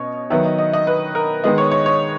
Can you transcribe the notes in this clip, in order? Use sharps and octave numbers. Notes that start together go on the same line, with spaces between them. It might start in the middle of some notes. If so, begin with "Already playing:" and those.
Already playing: B2 C#4 C#5 D#5
D#3 F#3 B3 E5
D#5
D#5
D#5
B4
A#4
D#3 G#3 B3 D#5
C#5
C#5
C#5